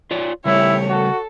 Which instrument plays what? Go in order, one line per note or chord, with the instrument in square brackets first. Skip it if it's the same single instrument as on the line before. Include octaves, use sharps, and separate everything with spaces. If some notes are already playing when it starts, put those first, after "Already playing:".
[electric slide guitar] F4 C#5 D5
[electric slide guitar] C#3 G3 A3 [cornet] E4 [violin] G4 C#5
[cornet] F#4 [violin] A4